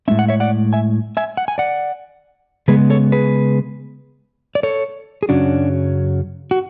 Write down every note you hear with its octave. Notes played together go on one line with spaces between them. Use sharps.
A2 G#3 C#4 E5
F#5
C#5 E5
D5 F#5
E5 G#5
E5 G#5
F#5
G#5
D5 F#5
C#3 G#3 B3 G#4 B4
A4 C#5
G#4 B4
D5
A4 C#5
G#4
F#2 C#3 F#3 C#4 D4 F#4
F#4